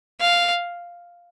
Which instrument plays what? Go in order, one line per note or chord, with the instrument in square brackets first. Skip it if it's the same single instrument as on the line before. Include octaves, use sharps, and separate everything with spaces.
[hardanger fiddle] F5